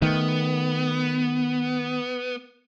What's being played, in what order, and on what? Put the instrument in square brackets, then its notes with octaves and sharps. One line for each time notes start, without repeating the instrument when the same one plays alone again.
[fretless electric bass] D#3 A3 [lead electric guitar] B3